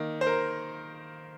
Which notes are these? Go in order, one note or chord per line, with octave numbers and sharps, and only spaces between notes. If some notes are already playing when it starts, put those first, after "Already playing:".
Already playing: D#3 A#3
C5
A#4